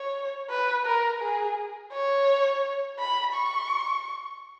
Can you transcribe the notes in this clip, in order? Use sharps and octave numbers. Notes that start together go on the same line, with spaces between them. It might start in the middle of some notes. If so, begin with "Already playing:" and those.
Already playing: C#5
B4
A#4
G#4
C#5
B5
C#6